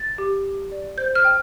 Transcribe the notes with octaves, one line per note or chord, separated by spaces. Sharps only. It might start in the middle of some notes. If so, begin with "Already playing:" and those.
Already playing: A6
G4
G4
D5
C5 G6
F6
G5